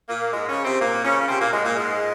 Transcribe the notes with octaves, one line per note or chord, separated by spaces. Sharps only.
A#2 A#3
G#2 G#3
C#3 C#4
C3 C4
A#2 A#3
C#3 C#4
C#4
C3 C4
A#2 A#3
G#2 G#3
A#2 A#3
G#2 G#3